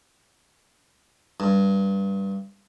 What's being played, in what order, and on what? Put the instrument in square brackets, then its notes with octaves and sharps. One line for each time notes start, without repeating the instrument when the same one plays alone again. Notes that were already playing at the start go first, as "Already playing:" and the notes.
[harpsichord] G2